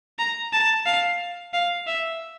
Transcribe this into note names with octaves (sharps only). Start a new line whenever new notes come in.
A#5
A5
F5
F5
E5